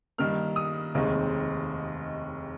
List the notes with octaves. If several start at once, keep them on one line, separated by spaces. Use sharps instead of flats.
G2 D#3 G3 A#3 F6
D#6
F1 D#2 D#3 G#3 C4